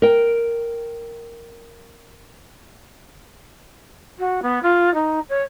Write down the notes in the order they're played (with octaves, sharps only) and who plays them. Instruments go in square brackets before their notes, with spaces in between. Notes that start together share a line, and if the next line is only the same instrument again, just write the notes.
[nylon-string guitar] A#4 G5
[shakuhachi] F#4
B3
F4
D#4
C#5